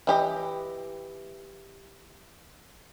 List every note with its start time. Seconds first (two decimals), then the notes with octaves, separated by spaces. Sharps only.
0.07 E3 G4 D#5